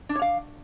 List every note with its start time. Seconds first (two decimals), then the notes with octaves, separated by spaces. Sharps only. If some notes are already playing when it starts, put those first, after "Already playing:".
0.09 D4
0.16 C#5
0.22 F5